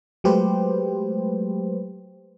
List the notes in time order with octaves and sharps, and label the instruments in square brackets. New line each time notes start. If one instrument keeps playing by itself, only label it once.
[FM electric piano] F#3 G#3 A3 G4 B4 C5